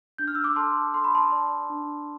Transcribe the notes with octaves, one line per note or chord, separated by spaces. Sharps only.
D4 G6
F6
E6
D6 F6
A4 A5 C6
A4 C6
B5
A5 C6
D5
D4